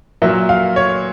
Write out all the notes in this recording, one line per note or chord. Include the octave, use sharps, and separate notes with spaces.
A#2 F#3 A#3 E5
F5
C#5